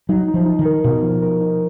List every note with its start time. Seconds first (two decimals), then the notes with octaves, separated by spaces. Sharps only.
0.09 F#3 D#4
0.28 D#4
0.34 F3
0.46 D#4
0.59 D#3
0.65 A#4
0.84 B2 D#4
1.02 F3
1.22 A#4
1.40 D#4